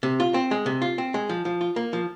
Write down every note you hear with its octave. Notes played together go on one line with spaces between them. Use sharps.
C3
F4
C4
G#3
C3
F4
C4
G#3
F3
F3
F4
A#3
F3